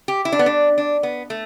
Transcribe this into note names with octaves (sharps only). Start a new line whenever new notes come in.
G4
E4
D4
B3
D4
D4
B3
A3